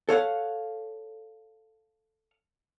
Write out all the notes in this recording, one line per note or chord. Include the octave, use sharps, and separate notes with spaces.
A4 C#5 F5 F#5